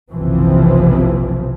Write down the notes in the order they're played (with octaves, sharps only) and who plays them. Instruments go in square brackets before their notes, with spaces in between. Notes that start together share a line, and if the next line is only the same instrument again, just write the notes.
[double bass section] F#1 B1 C3 E3 F3 C4